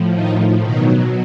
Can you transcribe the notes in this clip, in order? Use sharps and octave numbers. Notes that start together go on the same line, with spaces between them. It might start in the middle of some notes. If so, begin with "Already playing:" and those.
Already playing: A2 F3
D#3 D#4
B2 D#3 F#3 D#4